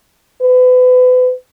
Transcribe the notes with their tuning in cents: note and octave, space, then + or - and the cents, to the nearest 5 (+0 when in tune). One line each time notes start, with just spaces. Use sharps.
B4 +35